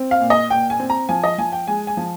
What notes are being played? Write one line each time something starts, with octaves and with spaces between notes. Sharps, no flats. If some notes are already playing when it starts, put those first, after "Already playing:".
Already playing: C4
F5
A#2
D#5
A#2 G5
G#5
C4
A#5
F3 G#5
D#5
F3 G#5
G5
G#3 G#5
G#5
F3